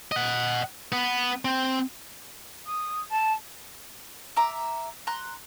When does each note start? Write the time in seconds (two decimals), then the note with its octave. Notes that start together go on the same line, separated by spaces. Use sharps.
0.12 D#5 F#5
0.92 B3
1.45 C4
2.66 D#6
3.10 A5
4.36 E5 A#5 D6
5.07 A#5 C6 F#6